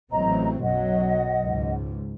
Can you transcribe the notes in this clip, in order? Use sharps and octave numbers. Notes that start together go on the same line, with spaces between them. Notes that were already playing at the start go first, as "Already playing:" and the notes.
A1 F#3 C4 D#5 A#5
B1 F#2 F#3 D#5 F#5
C#2 G#2